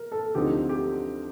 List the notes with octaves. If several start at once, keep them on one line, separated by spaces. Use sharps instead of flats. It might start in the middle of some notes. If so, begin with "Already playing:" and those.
Already playing: A#4
A4
D2 D3 F3 C4 D#4 G4
G4